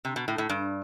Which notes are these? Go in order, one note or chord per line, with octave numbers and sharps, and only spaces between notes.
C3
B2
A2
A2
G2